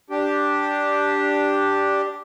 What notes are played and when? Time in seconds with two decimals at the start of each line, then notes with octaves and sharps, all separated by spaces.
0.10 D4 G4